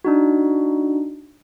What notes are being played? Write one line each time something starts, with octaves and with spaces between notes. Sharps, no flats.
D4 D#4 F#4